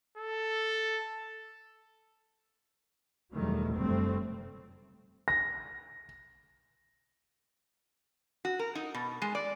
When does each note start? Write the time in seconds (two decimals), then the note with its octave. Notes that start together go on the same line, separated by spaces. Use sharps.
0.18 A4
3.33 E2 B2 D#3 F#3 G3 A3
3.75 F1 F#2 D3 G3 A3 C4
5.28 A#6
8.45 F#4
8.59 A#4
8.75 D#4
8.95 B2
9.22 G#3
9.35 D5